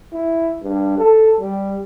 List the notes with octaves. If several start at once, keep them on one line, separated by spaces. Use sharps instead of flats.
E4
G2
A4
G3